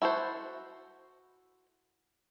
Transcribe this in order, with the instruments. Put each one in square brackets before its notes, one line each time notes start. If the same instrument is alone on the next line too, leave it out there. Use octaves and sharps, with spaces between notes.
[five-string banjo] E4 F#4 A4 C5